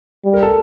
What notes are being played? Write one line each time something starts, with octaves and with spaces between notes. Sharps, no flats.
G3
A#4
A4